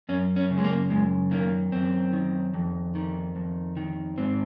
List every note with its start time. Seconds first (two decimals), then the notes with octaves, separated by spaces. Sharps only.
0.09 F#2 C#4
0.36 C#4
0.50 C#3
0.58 G#3
0.64 A#3
0.90 F#2 G#3
1.31 D#3 A#3
1.72 F#2 C4
2.13 D#3
2.54 F2
2.95 D#3
3.36 F2
3.77 D#3
4.18 G#2 C4